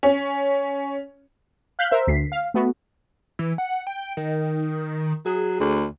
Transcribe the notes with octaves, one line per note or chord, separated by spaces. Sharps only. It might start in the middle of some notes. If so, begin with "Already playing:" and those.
C#4
F5 F#6 G6 B6
A#4 C5 E5
D2 B6 C7
F5
A3 B3 F#4
E3
F#5
G5
D#3
F#3 G#4
D2